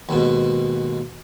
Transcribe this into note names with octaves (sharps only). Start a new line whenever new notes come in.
D#2 G#2 B2